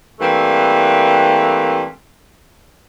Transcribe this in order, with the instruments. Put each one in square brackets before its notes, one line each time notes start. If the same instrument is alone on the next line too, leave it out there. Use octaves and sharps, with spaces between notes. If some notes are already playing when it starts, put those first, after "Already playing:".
[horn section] E3 G3 A3 A#3 C4 D4